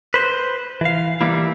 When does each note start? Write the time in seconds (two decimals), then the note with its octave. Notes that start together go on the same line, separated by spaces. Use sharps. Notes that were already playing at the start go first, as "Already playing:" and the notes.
0.14 B4 C5
0.81 E3 F5
1.21 E3 G3 A#3 E4